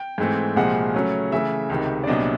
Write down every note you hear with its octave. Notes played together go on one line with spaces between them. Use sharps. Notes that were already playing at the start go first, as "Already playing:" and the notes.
Already playing: G5
G#2 E3 A3 C4
C2 A#2 F3 G#3 F#5
C#3 F#3 A3 C#4
C#3 E3 A3 E5
C#2 C3 D#3
D5
C2 A#2 F#3 B3 D4 D#5